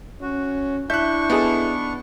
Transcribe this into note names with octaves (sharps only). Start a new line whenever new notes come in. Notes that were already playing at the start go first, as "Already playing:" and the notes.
C#4 F#4
D4 E4 E5 C#6 F#6 G6
B3 D#4 G#4 A4